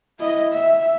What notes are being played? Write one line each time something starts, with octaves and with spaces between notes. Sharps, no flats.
E4 D#5
E5